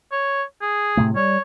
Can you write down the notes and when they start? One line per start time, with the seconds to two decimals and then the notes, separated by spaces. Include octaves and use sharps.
0.12 C#5
0.62 G#4
0.97 A2 C3 A3
1.16 G3 C#5